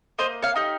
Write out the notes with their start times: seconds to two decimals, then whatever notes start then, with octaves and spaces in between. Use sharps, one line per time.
0.18 A#3 C5 D#5
0.42 C#5 F5
0.56 D#4 G4